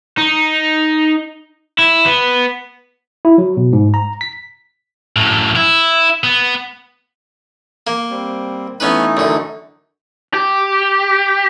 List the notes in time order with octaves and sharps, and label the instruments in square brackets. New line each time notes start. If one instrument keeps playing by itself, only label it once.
[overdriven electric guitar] D#4
E4
B3
[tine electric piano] E4
F#3
B2
G#2
A#5
B6
[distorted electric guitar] F#2 A2
E4
B3
[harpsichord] A#3
[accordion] G3 C4
[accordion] E3 A3 D#4 [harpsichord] B3 C#4 B4
[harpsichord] F#2 D3
[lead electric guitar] G4